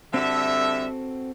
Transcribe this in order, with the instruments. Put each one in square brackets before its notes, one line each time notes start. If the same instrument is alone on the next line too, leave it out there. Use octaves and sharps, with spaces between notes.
[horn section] D3 G3 E5 [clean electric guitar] C4 F#4 A4